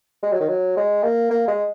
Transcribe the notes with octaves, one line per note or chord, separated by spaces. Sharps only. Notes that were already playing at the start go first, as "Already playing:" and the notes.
G#3
F#3
D#3
F#3
G#3
A#3
A#3
G#3